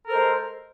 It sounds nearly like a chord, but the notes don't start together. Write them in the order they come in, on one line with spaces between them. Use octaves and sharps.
A#4 A4 C5 G#3